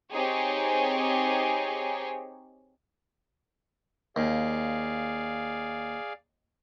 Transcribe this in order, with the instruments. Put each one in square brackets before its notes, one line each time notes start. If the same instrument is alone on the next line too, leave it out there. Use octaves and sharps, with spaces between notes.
[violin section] C4 D#4 G4 G#4 C#5
[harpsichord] D#2 [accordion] G#4 D5 F5